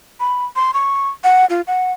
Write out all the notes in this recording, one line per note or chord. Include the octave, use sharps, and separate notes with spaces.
B5
C6
C#6
F#5
F4
F#5